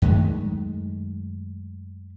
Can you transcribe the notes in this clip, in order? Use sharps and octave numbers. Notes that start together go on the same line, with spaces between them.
F#2 D#3 G#3 A3